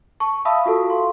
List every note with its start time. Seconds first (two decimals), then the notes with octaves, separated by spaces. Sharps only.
0.20 A5 C#6
0.45 E5 F5 A5 B5 D#6 E6
0.66 F4 F#4 A4 F5
0.90 C6